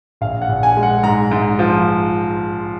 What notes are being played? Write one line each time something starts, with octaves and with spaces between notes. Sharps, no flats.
A#1 F5
F#5
A#1
G#5
G#3
F#5
G#2 A#5
G#2
F3